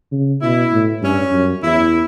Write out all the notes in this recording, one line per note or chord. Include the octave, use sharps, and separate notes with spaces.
C#3
B2 E4
A2
G2 C#4
F#2
E2 E4